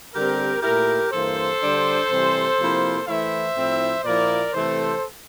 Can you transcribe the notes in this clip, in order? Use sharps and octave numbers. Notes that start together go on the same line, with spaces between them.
D3 G3 C4 G4 A#4
A#2 A3 E4 G4 A#4
G2 E3 A#3 A4 C5
D3 G3 D4
C3 E3 G3 C4
C3 F3 A#3 E4
E3 A3 E4 C5 E5
A2 F3 C4 E4
A#2 F3 A#3 E4 A#4 D5
C3 E3 A3 C4 A4 C5